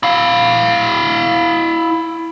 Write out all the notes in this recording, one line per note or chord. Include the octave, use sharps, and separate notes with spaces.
E4 F5